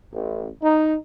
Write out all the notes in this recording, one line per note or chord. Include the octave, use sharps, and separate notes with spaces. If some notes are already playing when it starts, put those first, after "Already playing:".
A1
D#4